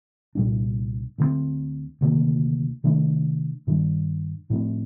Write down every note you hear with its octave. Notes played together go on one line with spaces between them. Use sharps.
C2 A#2 G3 D4
D2 D3 G3 C4
D2 C3 D#3 A#3
C3 D#3 A3 D4
G2 D#3 G3 D4
A2 F3 A3 C4